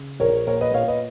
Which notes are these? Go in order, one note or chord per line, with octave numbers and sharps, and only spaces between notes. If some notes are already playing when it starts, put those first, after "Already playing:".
Already playing: C#3
A#1 A#4 C#5
A#2 A#4 C#5
B4 D#5
A#2 C#5 F5
B4 D#5